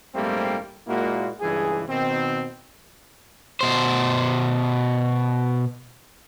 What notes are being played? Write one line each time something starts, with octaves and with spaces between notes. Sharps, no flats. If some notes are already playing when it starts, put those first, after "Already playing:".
A#1 G#2 G3 A3 A#3 C4
A#2 G#3 A#3 E4 F#4
C#2 G2 E3 G#4
B2 D#3 C4
B2 C5